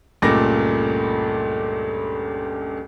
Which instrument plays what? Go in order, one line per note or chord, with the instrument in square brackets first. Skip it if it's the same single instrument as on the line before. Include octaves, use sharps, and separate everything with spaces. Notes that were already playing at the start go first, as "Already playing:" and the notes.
[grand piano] C#2 G2 A#2 A3 D6 A#6